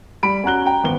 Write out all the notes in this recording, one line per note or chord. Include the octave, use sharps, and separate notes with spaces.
G3 B5 D7
C#4 F#4 A#5 F#6 G7
G5 A#5
G#1 B3 G7